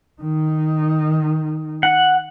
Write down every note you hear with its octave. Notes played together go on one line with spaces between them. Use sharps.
D#3 D#4
F#5